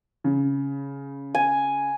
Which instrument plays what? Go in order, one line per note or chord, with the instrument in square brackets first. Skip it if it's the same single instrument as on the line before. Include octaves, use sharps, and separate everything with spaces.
[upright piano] C#3
[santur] G#5